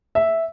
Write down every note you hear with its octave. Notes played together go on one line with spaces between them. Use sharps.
E5